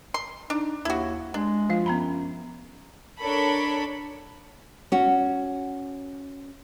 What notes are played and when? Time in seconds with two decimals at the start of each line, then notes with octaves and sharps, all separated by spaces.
0.14 C6
0.50 D4 D#4
0.85 D#2 E4 F#4
1.34 G#3 D4
1.69 F3 F4 F5
1.86 F#2 B3 A#5 B5
3.21 D4 A4 A#4 C#5 B5
4.92 C#4 F#4